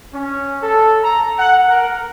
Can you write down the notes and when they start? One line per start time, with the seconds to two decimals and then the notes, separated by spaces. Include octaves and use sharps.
0.14 C#4
0.63 A4
1.04 A#5
1.39 F#5
1.69 A#4